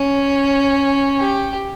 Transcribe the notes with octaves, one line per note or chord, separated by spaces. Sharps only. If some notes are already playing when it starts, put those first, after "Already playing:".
Already playing: C#4
G4